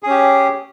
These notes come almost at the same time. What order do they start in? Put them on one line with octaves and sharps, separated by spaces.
G#4 C#4 G4